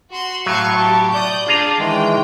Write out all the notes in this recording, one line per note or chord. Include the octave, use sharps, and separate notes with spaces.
F#4 C6
A2 F#3 F5 C#6
G4 A5
D5 D#6 G6
D4 F4 G#4 A#5
D#3 E3 G#3 G5